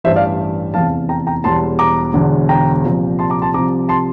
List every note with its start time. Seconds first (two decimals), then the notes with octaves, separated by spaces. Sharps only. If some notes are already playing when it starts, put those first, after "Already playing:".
0.04 A1 G2 E3 C5 E5
0.16 D5 F5
0.74 F1 E2 E3 F5 A5
1.09 G5 A#5
1.27 G5 A#5
1.44 E1 E2 E3 G3 A5 C6
1.79 A#5 D6
2.14 E1 E2 D3
2.49 G5 A#5
2.84 C2 A#2 F3
3.19 A5 C6
3.30 A#5 D6
3.42 A5 C6
3.54 C2 C3 F3 A#5 D6
3.89 A5 C6